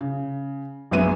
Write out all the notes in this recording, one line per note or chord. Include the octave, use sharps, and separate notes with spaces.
C#3
A#1 F#2 G#3 B3 E5 D#7